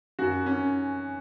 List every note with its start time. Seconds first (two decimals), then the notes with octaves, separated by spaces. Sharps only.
0.19 F#2 F#4
0.46 C#4